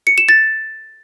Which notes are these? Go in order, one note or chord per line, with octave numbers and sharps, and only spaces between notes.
C#7
E7
A6